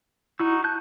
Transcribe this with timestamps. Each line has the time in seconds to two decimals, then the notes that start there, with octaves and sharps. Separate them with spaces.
0.40 D#4 E4 F#4 E6
0.64 A5 F#6 G6